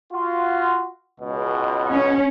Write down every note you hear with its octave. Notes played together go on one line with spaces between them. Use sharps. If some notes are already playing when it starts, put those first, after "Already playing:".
F4 F#4
C#2 B2
C#4